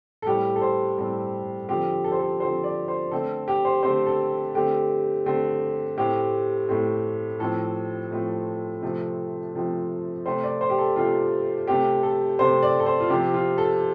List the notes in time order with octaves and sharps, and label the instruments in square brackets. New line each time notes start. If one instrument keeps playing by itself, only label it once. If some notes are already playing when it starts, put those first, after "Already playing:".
[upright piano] A4
A2 G3 C4 G4
A4
C5
A2 G3 C4 A4
D3 F3 C4 G4
A4
C5
A4
D3 F3 C4 C5
D5
C5
D3 A3 C4 A4
G4
C5
D3 A3 C4 C5
A4
D3 A3 C4 G4
D3 A3 C4
A2 A3 C4 G4
A2 A3 C4
A2 F3 A3 C4 A4
A2 F3 A3 C4
C3 F3 A3 C4
C3 F3 A3 C4
C3 A3 C4 C5
D5
C5
G4
A4
C3 A3 C4 F4
C3 A3 C4 G4
A4
C3 A3 C4 C5
D5
A4
C5
F4
C3 F3 C4 G4
F4
A4